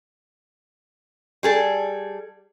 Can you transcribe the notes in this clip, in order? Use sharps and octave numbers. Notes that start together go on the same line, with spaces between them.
G3 G#4 A4